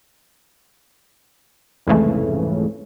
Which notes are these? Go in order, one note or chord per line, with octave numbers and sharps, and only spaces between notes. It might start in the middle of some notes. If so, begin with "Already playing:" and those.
C2 F2 G#2 C#3 E3 A3